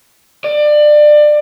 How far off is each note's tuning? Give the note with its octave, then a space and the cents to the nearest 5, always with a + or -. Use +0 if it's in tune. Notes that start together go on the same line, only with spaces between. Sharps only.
D5 +25